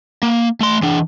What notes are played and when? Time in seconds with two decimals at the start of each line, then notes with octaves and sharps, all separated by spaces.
0.23 A#3
0.61 A3 C6
0.82 E3 D4